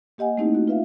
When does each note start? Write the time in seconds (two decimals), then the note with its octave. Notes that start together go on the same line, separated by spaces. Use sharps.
0.18 A#3 G4 D#5 F#5 G#5
0.37 A3 A#3 C4 D#4 E4 G4
0.54 B3 F#4
0.68 F4 B4 E5 F5